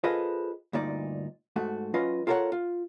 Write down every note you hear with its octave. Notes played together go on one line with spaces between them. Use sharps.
F4 G#4 A4 B4 C5 D#5
D2 G2 A#2 D#4 D5
G#2 A3 F#4
F#3 C#4 F4 B4 D#5
F4 A4 A#4 C5 C#5 F#5
F4